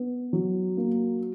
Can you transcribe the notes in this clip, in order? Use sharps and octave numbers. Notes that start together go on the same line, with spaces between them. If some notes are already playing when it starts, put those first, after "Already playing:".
Already playing: B3
F#3
A#3